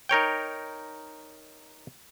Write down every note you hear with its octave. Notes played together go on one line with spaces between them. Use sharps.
D#4 A#4 C#5 G5